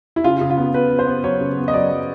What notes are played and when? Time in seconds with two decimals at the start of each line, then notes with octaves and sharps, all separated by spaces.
0.16 E4
0.24 C#3 F4
0.41 C#3
0.50 F4
0.57 B3
0.74 B3 B4
0.90 B3
0.99 C5
1.07 B3
1.24 F#3 C#5
1.41 C#3
1.58 B3
1.68 D#5
1.73 F#3 D5
1.91 F#3